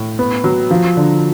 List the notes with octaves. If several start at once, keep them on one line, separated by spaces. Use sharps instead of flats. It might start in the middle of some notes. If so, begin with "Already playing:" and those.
Already playing: A2
B3
F#3
F3
D3